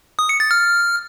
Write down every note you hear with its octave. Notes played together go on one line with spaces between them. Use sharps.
D#6
C#7
A6
F6